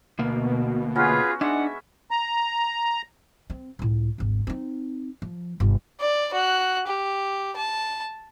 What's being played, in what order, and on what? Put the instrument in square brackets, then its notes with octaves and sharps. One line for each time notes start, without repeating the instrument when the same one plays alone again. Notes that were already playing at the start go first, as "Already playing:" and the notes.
[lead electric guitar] D2 A#3 [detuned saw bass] B2
[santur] B3 C#4 F#4 [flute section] F4 G#4 B4
[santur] G#3 E5 G#5 [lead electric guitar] D4 D#4 [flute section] F#5
[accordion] A#5
[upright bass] C4
C#2 A2
G#1 D2
C4 D#4
F3
G1 C3
[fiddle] D5
F#4 F#6
G4
A5